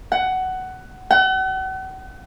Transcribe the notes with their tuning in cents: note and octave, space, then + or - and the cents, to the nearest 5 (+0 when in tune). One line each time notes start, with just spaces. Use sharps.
F#5 +15
F#5 +40